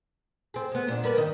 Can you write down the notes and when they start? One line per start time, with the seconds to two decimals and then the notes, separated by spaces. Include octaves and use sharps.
0.54 C4 G#4
0.72 G#3 B3
0.88 A#2 D4
1.04 G3 A#4 B4
1.16 G2 D#3 D#5